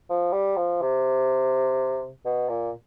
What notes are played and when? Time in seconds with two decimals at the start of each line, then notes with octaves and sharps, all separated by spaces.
0.10 F3
0.32 G3
0.57 F3
0.81 C3
2.25 B2
2.49 A#2